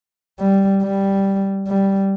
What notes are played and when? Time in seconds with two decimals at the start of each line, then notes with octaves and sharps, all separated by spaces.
0.40 G3
0.82 G3
1.68 G3